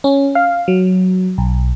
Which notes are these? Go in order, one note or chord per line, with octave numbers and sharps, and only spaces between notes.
C#4
F5
F#3
B1